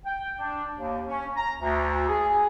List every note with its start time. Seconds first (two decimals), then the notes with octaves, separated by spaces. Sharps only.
0.05 G5
0.38 D4
0.76 D#2
1.07 C#4
1.36 A#5
1.59 D2
2.08 G#4